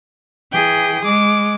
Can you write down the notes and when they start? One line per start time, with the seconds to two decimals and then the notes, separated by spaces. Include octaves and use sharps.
0.52 E3 G#4 G5
1.05 G#3 D6